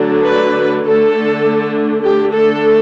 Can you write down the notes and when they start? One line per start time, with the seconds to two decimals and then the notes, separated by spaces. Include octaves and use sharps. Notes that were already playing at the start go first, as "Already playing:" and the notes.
Already playing: D3 F#3 A3 D4
0.25 B4
0.85 D3 A3 D4 A4
2.03 D3 A3 D4 G4
2.33 A4